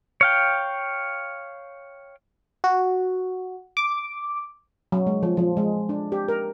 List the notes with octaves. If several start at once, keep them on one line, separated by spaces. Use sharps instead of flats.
C#5 F5 G5
F#4
D6
F#3
G#3
F3
F3
G#3
D4
G4
A#4